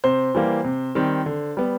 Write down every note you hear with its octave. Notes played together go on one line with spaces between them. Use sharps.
C3 C5
E3 G3 A#3
C3
D#3 G3 C4
D3
G3 B3